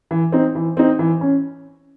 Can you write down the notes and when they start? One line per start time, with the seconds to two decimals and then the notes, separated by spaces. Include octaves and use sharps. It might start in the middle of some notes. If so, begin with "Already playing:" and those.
0.11 E3
0.32 C4 D#4
0.55 E3
0.77 C4 D#4
0.99 E3
1.21 C#4